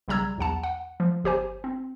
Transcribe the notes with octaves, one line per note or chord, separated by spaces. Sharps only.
B1 C#3 G3 A#5 E6 G#6
B1 E2 F#5 A5
F#5
F3
G1 G4 C5 G#5
C4